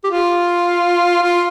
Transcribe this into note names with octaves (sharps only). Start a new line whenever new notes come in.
G4
F4
F4